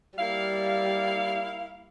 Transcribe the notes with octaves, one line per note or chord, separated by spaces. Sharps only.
G3 A#3 E4 F5